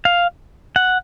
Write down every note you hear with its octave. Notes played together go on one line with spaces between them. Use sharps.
F5
F#5